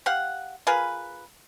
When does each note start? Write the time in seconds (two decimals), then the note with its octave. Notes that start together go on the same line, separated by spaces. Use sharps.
0.06 G4 F5 F#5
0.67 F4 G#4 A#4 B4